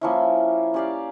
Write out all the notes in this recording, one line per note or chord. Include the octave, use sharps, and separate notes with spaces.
F3 A#3 C#4 E4
C#4 G4 D5 F5